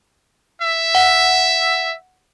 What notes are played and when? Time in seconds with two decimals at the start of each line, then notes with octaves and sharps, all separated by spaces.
0.61 E5
0.95 F#5